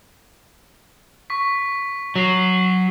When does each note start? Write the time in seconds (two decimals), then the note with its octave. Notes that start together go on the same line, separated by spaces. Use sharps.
1.30 C#6 B6
2.16 F#3 C#6 C7